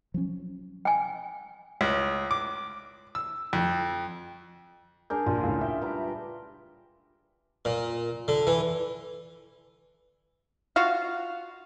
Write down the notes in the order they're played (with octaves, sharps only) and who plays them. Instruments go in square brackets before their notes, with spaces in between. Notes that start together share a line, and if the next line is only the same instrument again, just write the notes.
[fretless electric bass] F3 F#3 C#4
[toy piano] G5 G#5
[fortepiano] C#2
D6
E6
F2
[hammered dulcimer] D4 G#4 A#4 [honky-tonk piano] G6
[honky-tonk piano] A#1 A#2 [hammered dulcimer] F4
[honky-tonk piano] C#2 A2
[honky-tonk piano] E5 [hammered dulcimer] G5
[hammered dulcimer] G3 B4 A#5
[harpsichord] A#2
D3
E3
[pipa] F4 F#4 F5